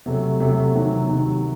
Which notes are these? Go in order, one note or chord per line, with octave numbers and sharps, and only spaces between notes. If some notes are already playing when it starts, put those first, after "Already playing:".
C3 F#3 A3
C3 F#3 A3
C3 D#3 F#3
C3 D#3 F#3